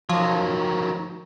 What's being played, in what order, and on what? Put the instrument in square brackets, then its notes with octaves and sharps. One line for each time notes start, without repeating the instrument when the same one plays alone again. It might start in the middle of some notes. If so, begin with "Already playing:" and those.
[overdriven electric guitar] D#3 F#3 [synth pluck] F3